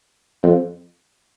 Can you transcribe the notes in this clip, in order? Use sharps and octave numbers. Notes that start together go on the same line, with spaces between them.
F2